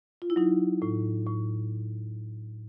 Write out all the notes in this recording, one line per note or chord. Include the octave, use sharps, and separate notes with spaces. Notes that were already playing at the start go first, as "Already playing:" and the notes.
F4
E4
F#3 D#4
A2
A2